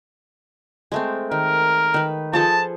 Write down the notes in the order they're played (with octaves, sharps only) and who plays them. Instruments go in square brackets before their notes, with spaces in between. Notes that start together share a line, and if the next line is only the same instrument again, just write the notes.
[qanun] G#3 A3 C4
[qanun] D#3 [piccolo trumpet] A#4
[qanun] D#3 B4
[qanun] F3 G#4 A4 [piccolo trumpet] A5